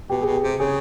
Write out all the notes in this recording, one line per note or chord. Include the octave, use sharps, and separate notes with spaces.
B2 G4
B2 G#4
G4
C3
C#3 G#4